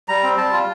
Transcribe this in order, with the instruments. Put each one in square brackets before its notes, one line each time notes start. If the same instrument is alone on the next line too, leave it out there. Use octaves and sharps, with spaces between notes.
[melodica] G3 A#5
C4
G3 A5
F4